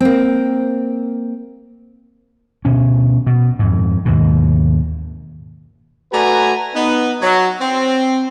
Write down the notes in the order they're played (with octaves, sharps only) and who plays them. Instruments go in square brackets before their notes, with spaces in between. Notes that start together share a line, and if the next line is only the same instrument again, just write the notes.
[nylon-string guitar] A#3 C4
[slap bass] D2 B2 C#4
B2
F2 G#2
D#2 G#2 B2
[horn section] A3 F#4 B4 D5 G#5 A#5
B3 D#4 B4
F#3
C4